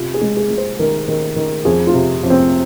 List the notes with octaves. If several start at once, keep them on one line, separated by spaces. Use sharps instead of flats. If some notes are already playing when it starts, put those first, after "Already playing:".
Already playing: C3 F4
G#4
G#3
G#4
G#3
C5
D#3 A#4
D#3
D#3
F2 G#4
F4
C3
F2
C4